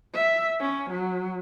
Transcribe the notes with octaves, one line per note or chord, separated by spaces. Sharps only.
E5
C#4
F#3